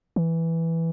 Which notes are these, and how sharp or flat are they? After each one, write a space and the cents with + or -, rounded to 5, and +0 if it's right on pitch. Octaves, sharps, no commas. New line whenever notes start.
E3 +0